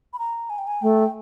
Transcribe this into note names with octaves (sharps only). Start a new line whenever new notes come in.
B5
A#5
G#5
G5
G#5
A3 G5